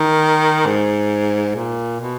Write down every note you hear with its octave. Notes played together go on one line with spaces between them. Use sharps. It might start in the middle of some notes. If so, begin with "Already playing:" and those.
Already playing: D#3
G#2
A#2
B2